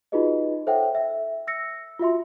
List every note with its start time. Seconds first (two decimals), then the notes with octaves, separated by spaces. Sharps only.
0.12 D#4 F4 F#4 G#4 B4 D#5
0.67 A4 C5 C#5 E5 F#5 G5
0.95 E5
1.47 E6 A#6 C#7
1.99 F4 F#4 E5 C6